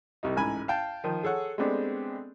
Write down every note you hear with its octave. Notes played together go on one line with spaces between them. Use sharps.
C2 G3 D#4
A1 G#2 G#5 B5
F5 G5 A5
D#3 F3
G#4 A4 C#5 F#5
G#3 A3 B3 C4 D4 G4